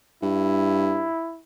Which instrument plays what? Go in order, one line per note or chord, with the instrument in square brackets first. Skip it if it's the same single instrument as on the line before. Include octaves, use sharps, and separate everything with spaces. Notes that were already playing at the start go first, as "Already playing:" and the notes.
[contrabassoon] G2 [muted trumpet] E4